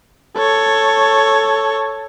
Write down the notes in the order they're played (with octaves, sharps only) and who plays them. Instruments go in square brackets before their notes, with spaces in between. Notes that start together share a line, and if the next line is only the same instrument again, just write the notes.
[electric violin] A4 C#5